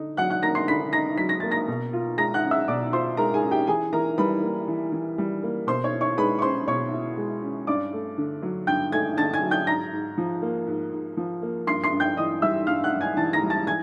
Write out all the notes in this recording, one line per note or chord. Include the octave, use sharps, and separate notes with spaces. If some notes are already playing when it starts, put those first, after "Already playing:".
Already playing: D3 D#4
F#3 F#5 F#6
F#5 F#6
A#3 A#5 A#6
C6 C7
D3 B5 B6
D#4 A#5 A#6
F#3 B6
A#6
A#3 A6
A#5 A#6
B2
F4
G#3 A#5 A#6
F#5 F#6
C#4
E5 E6
B2 D5 D6
F4 C5 C6
G#3 A#4 A#5
G#4 G#5
C#4
G4 G5
E3 G#4 G#5
E3 A#4 A#5
G3 B4 B5
A#3
E3
E3
G3
A#3
B2 C5 C6
C#5 C#6
E4
C#5 C#6
G#3 B4 B5
C#6
C#4 C5 C6
B2 C#5 C#6
E4
G#3
C#4
G2 D5 D6
A3
D3
F#3
G2 G5 G6
A3 G#5 G#6
D3 A5 A6
G#5 G#6
F#3
G5 G6
G#2 A#5 A#6
G#2
F3
A#3
G#2
G#2
F3
A#3
G2 C6 C7
C6 C7
G2
G5 G6
E3 D#5 D#6
G3 E5 E6
G2 F5 F6
F#5 F#6
G2
G#5 G#6
E3 A5 A6
A#5 A#6
G3
A5 A6
E3 G#5 G#6